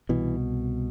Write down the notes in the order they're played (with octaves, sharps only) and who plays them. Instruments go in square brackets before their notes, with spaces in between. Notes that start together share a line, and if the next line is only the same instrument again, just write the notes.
[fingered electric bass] C2 B2 E3